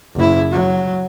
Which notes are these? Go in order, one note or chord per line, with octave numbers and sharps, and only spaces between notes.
F#1 E4
F#3